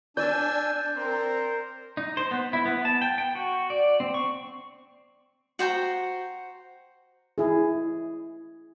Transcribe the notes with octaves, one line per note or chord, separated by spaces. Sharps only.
D4 D5 G#5 E6 G6
C4 A#4 C5
D#4
C5
B3
E4
B3
A5
G5
G5
F#4
D5
C4
C#6
F#4 C5 G5 A#5
E4 G#4